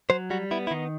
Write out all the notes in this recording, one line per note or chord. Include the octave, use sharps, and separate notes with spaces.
F#3 C5
G3 F#4
B3 E4
E4
D#3 D#4